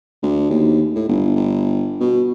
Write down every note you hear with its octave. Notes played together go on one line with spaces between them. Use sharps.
D2
D#2
A2
G1
G1
B2